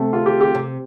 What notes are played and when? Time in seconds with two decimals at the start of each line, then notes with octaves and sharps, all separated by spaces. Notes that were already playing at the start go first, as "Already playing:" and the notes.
Already playing: C3 A3
0.13 F4
0.26 G4
0.41 G4
0.55 C3